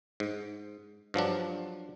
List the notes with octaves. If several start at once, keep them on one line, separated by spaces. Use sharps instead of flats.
G#2
G2 F3 F#3 D4